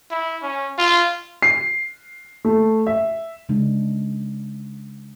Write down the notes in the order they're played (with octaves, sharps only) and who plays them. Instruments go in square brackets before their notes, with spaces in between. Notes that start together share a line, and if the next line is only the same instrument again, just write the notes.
[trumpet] E4
C#4
F4
[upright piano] C7
A3
E5
[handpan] C#3 G#3 D4